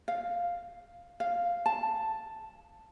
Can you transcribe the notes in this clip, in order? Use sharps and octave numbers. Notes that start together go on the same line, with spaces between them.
F5
F5
A5